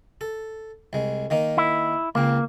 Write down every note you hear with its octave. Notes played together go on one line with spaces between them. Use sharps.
A4
C2 G#3
D#3 A#3 D#4
E4
C#2 A#3 C4